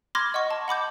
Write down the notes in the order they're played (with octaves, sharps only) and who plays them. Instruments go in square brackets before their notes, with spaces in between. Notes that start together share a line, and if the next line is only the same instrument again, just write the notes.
[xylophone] B5 C6 D6 F6 G#6 A#6
D#5 F#5 C#6
A5
F#5 B5 D6 G6